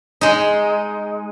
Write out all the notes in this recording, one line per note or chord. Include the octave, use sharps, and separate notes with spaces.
G#3 D#4